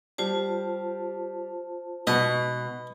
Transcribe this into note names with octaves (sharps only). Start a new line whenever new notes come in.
G3 F4 G4 C5 D5 A5
G#2 B2 B4 D#5 C#6